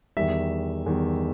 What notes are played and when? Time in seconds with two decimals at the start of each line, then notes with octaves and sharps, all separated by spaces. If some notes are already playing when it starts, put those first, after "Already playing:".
0.17 E2 D#3 G3 E5
0.86 E2 D#3 G3